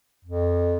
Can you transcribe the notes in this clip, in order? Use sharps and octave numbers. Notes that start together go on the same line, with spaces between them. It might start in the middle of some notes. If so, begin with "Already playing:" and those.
F2